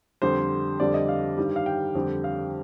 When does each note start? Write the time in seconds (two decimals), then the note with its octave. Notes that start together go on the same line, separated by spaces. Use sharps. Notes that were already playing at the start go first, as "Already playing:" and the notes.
0.22 F2 D3 G3 C5
0.80 F2 D3 G3 D5
0.94 D#5
1.09 F5
1.37 G2 D#3 G3
1.56 F5
1.66 G5
1.95 F2 D3 G3
2.24 F5